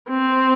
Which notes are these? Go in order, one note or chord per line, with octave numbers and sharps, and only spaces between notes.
C4